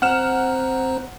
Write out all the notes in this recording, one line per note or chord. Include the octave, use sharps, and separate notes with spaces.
C4 C5 F#5 A#5 F6 E7